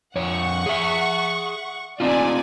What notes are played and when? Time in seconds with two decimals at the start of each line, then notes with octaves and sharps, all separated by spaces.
0.16 F2 C#5 F#5 C#6
0.66 G#4 E5
2.00 C4 D#4 F4 D5 G#5